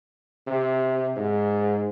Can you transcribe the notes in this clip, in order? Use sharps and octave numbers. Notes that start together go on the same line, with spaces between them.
C3
G#2